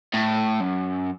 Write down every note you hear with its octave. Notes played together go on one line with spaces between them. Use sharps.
A2
F#2